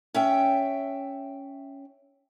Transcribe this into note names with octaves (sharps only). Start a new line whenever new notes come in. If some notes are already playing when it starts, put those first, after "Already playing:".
C#4 E5 G5